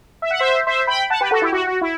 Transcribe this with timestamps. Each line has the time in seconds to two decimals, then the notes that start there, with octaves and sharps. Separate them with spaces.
0.22 E5
0.31 F#5
0.39 C5 E5
0.67 C5 E5
0.87 G5 B5
1.10 F#5 A5
1.21 G4 B4
1.31 F#4 A4
1.42 E4 G4
1.53 F#4
1.67 F#4
1.81 E4